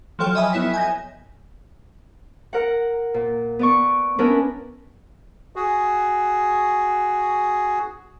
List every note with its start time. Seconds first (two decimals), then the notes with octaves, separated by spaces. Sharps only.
0.19 F3 F#3 A4 C#5 G5 F6
0.35 D#5 E5 G#5 B5 D#6
0.53 B3 E4 C#5 B6
0.74 G#5 G6 A#6
2.53 A#4 F#5
3.14 A#2
3.59 B3 D5 C#6
4.18 B3 C#4 D4 E4 A#4 B4
5.56 F#4 G#4